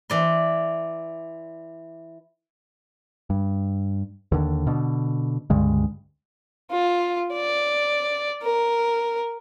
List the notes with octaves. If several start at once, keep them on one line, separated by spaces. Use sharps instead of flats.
E3 D5 C6
G2
D#2 D3
B2 D3
C#2 G2 D3 G#3
F4
D5
A#4